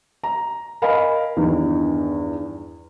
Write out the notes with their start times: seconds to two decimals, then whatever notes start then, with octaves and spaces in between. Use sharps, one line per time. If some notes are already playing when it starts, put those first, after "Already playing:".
0.24 A#5
0.82 A#4 D#5 F5 G#5 B5
1.37 E2 G2 D#3